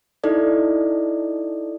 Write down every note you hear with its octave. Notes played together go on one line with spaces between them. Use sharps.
D#4 E4 A4 D5